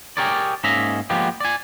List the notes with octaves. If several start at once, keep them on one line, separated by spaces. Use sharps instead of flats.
G4 G#4 A#4 C#5 D5
G#2 A#3 C#4 D#5 E5 A#5
F3 G#3 A#3 B3 G4
D5 G#5